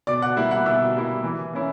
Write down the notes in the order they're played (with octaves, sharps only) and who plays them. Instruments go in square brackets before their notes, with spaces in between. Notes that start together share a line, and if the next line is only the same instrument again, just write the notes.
[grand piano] B2 D5 D6
F#5 F#6
G3 A#3 E4
F#5 F#6
B2 E5 E6
G3 A#3 E4
E3
A#3 C#4 E4